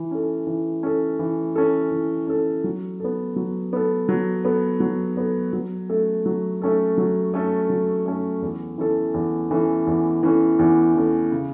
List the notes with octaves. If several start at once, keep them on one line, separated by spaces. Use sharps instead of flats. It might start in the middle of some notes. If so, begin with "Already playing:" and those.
Already playing: E3
C#4 A4
E3
C#4 A4
E3
C#4 A4
E3
C#4 A4
F#3
B3 A4
F#3
B3 A4
F#3
B3 A4
F#3
B3 A4
F#3
A3 C#4 A4
F#3
A3 C#4 A4
F#3
A3 C#4 A4
F#3
A3 C#4 A4
E2
E3 C#4 A4
E2
E3 C#4 A4
E2
E3 C#4 A4
E2
E3 C#4 A4
C#3